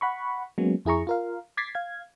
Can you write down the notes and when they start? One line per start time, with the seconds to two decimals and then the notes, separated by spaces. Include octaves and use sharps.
0.01 F#5 B5 C#6
0.58 F#3 G#3 A#3 B3 C#4
0.85 F2 E4 G#4 A#5 C#6
1.07 F4 A#4 F5
1.57 D6 G#6 A6 B6 C7
1.75 F5 G#6